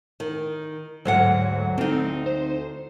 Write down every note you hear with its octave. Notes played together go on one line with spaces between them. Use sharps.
D#3
D2 G#2 F#3 F#5
D2 C4 D#4
C5